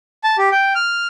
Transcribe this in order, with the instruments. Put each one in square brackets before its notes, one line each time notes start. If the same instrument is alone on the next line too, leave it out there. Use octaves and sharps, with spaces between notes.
[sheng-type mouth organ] A5
G4
G5
F6